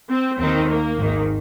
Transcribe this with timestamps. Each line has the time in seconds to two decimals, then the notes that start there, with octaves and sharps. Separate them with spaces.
0.10 C4
0.39 D#2 D#3 C4
0.69 A#3
0.98 G#1 G#2 D#3